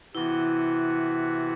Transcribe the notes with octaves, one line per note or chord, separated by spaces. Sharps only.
C3 E3 B3 E4 F#4